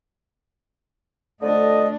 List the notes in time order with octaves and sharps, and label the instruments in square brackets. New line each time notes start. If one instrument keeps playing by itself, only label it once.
[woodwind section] F2 D3 D#5 [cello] A3 D4